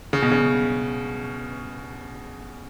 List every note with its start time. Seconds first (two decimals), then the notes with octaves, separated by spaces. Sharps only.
0.13 C#3
0.22 B2
0.32 C#3